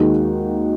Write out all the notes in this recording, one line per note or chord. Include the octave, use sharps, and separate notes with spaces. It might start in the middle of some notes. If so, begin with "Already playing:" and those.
Already playing: D#2 D#3 G#3 D#4 F#4